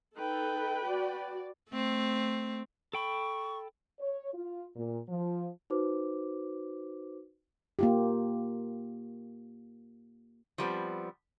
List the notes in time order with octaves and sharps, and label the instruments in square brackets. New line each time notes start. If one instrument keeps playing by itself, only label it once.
[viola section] D#4 A4 [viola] B4 G5
[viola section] F#4 D5
[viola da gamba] A3 C4
[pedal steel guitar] A4 G5 B5 [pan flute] C#6
[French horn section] C#5
F4
A#2
F3
[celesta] D#4 F#4 B4 C5 D6
[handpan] A#3 F4 G4
[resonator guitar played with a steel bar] F3 G3 B3 C4